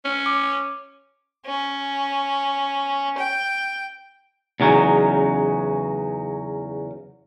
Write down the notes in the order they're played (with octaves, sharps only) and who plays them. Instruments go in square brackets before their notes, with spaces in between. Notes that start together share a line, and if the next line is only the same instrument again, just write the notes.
[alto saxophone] C#4
[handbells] D6
[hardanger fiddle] C#4
G5
[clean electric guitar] E2 C#3 F#3 C#4 D#4